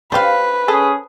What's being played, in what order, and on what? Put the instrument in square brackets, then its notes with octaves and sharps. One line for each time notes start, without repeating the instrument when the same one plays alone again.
[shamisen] D4 G4 [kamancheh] B4 [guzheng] C5 F5
[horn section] C#4 G#4 [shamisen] A4